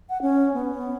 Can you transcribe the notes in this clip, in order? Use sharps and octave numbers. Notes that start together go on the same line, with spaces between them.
F#5
C#4
B3